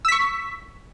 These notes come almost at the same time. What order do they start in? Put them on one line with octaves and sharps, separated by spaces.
E6 B6 C#6